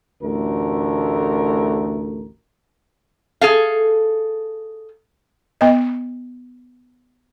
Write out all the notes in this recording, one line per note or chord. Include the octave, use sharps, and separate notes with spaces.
A1 D2 A3 A#4
G#4 A4 F5
B3 D#5